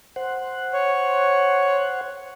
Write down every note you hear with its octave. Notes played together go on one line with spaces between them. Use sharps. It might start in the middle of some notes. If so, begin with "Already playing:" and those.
C5 F#5
C#5